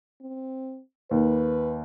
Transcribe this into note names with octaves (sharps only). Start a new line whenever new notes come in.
C4
D#2 B4